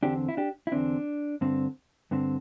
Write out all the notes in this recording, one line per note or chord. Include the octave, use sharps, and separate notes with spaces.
E2 D3 C4 D4 G4
E4
D4 G4
E4
E2 D3 C4 D4
G2 D3 C4
G2 D3 C4